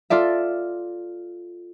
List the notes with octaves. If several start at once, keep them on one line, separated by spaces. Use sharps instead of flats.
F4 A4 D5 E5